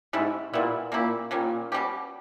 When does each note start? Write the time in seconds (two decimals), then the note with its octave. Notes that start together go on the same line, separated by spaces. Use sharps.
0.13 G#2 G3 C#4 E4
0.52 A#2 G3 B3 E4
0.92 A#2 A#3 C#4 E4 G4
1.31 A#2 D#3 G3 C#4
1.72 B2 G3 C#4 G4